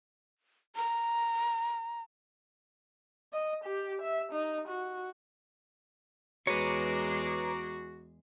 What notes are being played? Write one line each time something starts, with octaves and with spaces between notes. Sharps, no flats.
A#5
D#5
G4
E5
D#4
F#4
E2 G#3 F#4 G#4 B4 C#5 A#5 D6